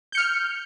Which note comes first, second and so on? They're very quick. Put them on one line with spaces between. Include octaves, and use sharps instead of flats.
G6 C#7 F6